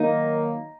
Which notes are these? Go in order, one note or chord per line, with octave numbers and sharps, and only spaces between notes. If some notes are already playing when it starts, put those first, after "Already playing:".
Already playing: D#3 F#3 A#3 D#4